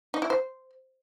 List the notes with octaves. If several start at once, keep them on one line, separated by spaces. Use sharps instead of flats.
D#4
E4
C5